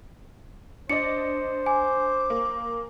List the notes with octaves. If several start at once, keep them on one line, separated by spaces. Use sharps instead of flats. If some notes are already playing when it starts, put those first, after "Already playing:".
D4 C5 D5 D#5 C#7
G#5 D6
A#3